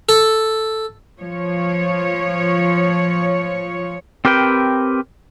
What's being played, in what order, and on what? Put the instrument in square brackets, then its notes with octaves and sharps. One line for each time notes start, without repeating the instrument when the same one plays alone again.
[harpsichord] A4
[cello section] F3 C#5
[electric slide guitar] C4 G4 A#4 B4 G5